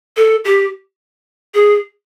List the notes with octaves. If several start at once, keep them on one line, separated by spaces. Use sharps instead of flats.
A4
G4
G#4